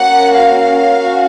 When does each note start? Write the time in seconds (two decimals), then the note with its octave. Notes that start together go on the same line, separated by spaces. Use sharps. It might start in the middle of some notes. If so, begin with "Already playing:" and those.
Already playing: A#3 C#4 F#4 F#5
0.37 F5
0.90 C#4 F#4